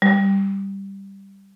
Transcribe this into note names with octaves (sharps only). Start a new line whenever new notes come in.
G3